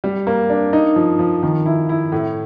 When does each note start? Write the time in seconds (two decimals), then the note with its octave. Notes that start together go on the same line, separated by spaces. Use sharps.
0.04 G3
0.27 A#3
0.50 D4
0.73 D#4
0.96 F3
1.19 F3
1.43 D#3
1.66 E4
1.89 E4
2.12 A2